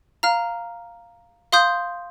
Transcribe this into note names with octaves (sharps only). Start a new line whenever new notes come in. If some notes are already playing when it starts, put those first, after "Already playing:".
F5 A#5 F6
F5 C6 D#6 G6